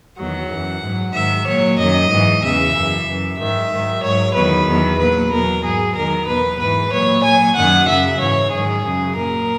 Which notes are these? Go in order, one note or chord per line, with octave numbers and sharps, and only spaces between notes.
E2 D#3 F#3 F#5
F#2 E3
G#2 F#3
G#2 D#3 F#3 E5
A#2 F#3 C#5
F#2 D#3 F#3 D#5
G#2 E3
E2 C#3 E3 E5
F#2 E3
F#2 E3
G#2 D#3 F#3 E5
G#2 D#3 F#3
G#2 F#3 C#5
E2 D#3 F#3 B4
E2 D#3 F#3
A#2 F#3 B4
E2 B2 F#3 A#4
G#2 F#3 G#4
E2 D#3 F#3 A#4
E2 B2 F#3 B4
G#2 E3 B4
A#2 F#3 C#5
A#2 F#3 G#5
F#2 D#3 F#3 F#5
F#2 C#3 F#3 E5
G#2 E3 C#5
G#2 D#3 F#3 G#4
F#2 C#3 F#3
A#2 F#3 A#4